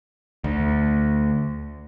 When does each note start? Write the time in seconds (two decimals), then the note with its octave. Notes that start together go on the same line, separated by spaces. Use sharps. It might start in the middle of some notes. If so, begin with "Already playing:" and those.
0.44 D2